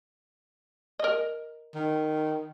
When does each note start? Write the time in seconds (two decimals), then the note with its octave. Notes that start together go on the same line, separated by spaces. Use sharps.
0.99 A#4 D#5
1.75 D#3